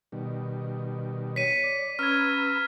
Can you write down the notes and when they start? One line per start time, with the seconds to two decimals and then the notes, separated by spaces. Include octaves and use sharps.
0.12 B2 D#3 G3
1.36 C#5 B6 D#7
1.64 D5
1.99 C#4 B4 A#5 E6 F6 G#6